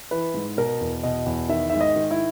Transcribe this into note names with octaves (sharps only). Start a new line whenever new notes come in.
E3 B4
G#2
B2 A#4
E2
B2 D#5
E2
D#3 E5
G#2 E5
D#5
D#3
E4